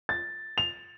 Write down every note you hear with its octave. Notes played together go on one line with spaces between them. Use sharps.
A6
F7